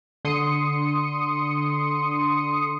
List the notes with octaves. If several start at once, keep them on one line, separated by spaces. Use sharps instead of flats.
D3 C6 D#6 C#7